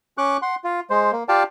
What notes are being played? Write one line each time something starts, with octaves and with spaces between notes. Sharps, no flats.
C#4 C#6 D6 F#6
F#5 C6
F4
G#3 C5
A#3
F4 G4 D5 F5 G5 A5